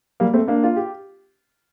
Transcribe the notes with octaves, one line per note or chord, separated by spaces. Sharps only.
G3 A#3
A3 C4
A#3 D4
F4
G4